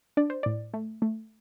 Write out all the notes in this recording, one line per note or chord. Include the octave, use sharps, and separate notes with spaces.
D4 D5
C5
A2 D5
A3
A3